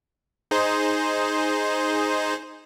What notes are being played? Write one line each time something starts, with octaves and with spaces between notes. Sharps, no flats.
D#4 G#4 C5